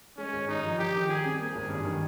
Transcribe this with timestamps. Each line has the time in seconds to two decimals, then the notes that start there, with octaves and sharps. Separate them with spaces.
0.18 G#3 C#4
0.33 G#1
0.48 G2 D#4
0.63 F3
0.79 D#3 G4
0.94 D#3
1.08 G3 G#4
1.24 C4
1.39 A#3 G#4
1.55 G#1
1.69 G2
1.85 D#3